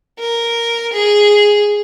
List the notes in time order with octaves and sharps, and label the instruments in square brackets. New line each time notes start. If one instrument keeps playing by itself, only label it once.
[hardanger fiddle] A#4
G#4